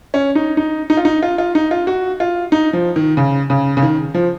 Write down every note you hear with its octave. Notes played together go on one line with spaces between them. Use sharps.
C#4
D#4
D#4
D#4
F4
D#4
F4
F4
D#4
F4
F#4
F4
D#4
F3
D#3
C#3
C#3
C#3
D#3
F3